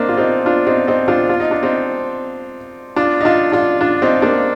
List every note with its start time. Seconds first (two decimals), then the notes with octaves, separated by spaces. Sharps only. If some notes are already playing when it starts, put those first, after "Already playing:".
Already playing: A#3 C4 D4 D#4
0.09 F4
0.18 C4 D#4
0.46 D4 F4
0.67 C4 D#4
0.87 C4 D#4
1.08 D4 F4
1.29 F4
1.40 D#4
1.51 D4
1.63 C4 D#4
2.96 D4 F4
3.21 D#4
3.25 D4 F4
3.52 D4 F4
3.81 D4 F4
4.02 C4 D#4
4.22 A#3 D4